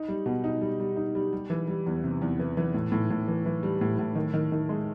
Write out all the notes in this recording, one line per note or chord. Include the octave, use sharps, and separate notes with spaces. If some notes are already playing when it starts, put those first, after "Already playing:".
Already playing: D#4
G3
B2
D#4
G3
G3
D#4
G3
G3
E3
G3
E2
C3
E2
E3
E3
A2
A2
A2
E3
E3
G3
A2
A2
D#3
D#3
D#3
G#3